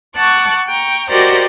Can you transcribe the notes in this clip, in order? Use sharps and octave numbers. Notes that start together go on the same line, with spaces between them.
F#5 A5 C#6 D6 F#6
G5 A#5 C#6
F#4 G4 A#4 C5 D5 D#5